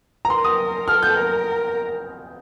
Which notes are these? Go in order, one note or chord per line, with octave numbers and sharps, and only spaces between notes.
A#5
A#4 C6
D#6
A4 F6
G6
A#4